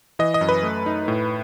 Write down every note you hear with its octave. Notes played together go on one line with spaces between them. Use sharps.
E3 D#5
D#5
F#2
B4
A3
D#4
A2